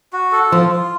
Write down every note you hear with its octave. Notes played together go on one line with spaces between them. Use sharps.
F#4
A4
F3 F4
F4